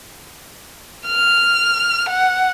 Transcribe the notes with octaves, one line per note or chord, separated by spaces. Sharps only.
F6
F#5